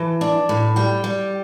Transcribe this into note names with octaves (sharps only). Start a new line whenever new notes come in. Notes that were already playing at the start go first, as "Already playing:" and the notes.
Already playing: E3 A5
D4
A2
G3 G5
G3